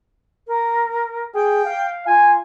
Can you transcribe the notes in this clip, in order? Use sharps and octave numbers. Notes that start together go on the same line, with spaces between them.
A#4
G#4 G5
F5
F4 G#5